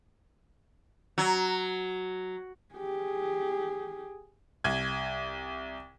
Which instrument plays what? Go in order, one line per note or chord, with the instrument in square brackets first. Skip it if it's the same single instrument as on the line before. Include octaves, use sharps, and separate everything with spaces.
[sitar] F#3
[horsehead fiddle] G4 G#4
[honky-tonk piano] C2 G#6